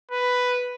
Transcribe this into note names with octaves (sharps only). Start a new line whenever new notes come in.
B4